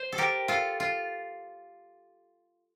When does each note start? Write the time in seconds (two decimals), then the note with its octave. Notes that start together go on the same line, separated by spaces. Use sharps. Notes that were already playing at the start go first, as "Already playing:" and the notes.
Already playing: C5
0.12 A4
0.18 G4 A#4
0.48 F4 A4
0.80 F4